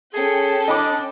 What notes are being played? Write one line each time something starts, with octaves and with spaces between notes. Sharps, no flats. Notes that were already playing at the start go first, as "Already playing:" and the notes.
C#4 G#4 A4 G5
D4 D#5 B5 D6